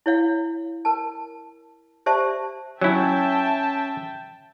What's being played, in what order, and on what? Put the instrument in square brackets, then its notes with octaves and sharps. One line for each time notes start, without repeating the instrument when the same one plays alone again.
[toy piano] E4 C#5 F5
A#4 A5
G4 C5 D5 E5 A5
[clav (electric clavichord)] F#3 E4 [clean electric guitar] C#4 [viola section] E5 G5 A5